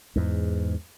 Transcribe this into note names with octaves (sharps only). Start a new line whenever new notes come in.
E2 G#2